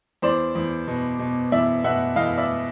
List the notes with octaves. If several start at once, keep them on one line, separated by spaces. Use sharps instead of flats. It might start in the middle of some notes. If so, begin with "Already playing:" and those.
E2 C5 D5
E2
B2
B2
E2 D5 E5
B2 E5 F#5
E2 D#5 F5
D5 E5